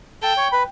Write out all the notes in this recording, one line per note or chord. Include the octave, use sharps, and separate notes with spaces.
A4 G5 A5
C#5 C#6
B4 B5